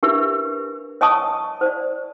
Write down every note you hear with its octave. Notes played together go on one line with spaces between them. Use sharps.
D4 G4 A#4 B4 E5
C#5 D#5 G#5 A5 C#6 D#6
C5 D5